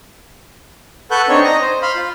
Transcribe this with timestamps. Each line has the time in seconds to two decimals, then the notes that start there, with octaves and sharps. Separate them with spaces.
1.11 A4 B4 F#5 C#6 F#6 G6
1.29 C4 D4 D#4 C#5 C#6
1.44 D#5 A#5
1.61 C5
1.82 F5 B5 C6
1.95 F4